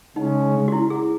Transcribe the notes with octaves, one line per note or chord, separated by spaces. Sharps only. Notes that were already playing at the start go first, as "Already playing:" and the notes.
C#3 G#3 C#4 D#4
F#4
E4
G#4